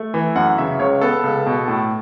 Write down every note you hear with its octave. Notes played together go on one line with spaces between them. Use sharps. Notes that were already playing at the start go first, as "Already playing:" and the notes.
Already playing: A3
E3
F#2 F#5
C#3 E5
C#2 C#5
B3 A4
C#2
B2
A2